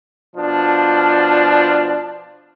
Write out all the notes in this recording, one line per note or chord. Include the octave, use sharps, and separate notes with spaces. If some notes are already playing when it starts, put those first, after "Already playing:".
B2 F3 D4